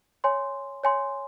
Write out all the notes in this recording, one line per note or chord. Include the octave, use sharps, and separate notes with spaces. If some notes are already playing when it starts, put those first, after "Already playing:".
C#5 G#5 C6
C#5 G#5 C6